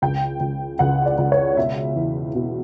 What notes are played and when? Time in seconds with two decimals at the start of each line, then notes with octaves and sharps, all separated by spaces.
0.02 C#2 G5
0.40 C#2
0.79 C#2 F#5
1.06 D5
1.18 C#2
1.32 C#5
1.57 B2 E5
1.96 E2
2.35 B2